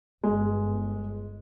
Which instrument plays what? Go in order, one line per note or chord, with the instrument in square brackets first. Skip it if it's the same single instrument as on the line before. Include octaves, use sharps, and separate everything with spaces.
[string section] G1 [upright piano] G#3